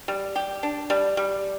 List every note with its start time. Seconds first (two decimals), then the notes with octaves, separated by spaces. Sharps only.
0.08 G3
0.36 G4
0.63 D4
0.90 G3
1.17 G3